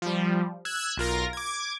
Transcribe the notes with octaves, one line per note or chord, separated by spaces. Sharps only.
F3 G3
E6 F#6 G#6
B1 F4 A#4 A#6
D6 G#6